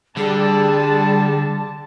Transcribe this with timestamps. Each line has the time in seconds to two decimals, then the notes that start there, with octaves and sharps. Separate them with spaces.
0.17 D3 G3 G#4 A5